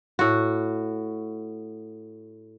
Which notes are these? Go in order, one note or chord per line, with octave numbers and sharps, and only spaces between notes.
A2 F#4